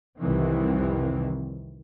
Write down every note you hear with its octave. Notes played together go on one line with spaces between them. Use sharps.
C2 F2 C3 D#3 E3 C4